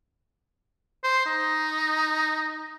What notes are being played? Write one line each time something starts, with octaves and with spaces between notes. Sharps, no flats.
C5
D#4